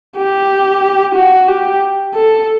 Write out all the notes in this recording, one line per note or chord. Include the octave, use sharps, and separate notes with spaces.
G4
F#4
G4
A4